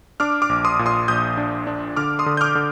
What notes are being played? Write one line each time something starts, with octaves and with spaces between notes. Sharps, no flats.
D4 D6 F6
D6 F6
A#1
C6 D#6
A#2
C6 D#6
A#1 D#6 G6
D4
D4
D3 D6 F6
C6 D#6
D3
G6
D6 F6
D3